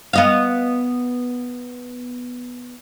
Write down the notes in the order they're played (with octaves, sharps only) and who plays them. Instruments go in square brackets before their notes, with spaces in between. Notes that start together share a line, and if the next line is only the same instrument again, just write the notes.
[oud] B3 D#5 F5